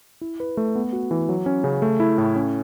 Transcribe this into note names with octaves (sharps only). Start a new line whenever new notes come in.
E4
B4
A3
B3
F#4
E3
F#3
C#4
C#3
A3
E4
A2
C#4